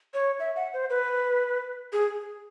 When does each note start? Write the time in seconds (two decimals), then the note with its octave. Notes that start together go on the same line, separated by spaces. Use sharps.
0.14 C#5
0.40 E5
0.56 F#5
0.74 C5
0.90 B4
1.92 G#4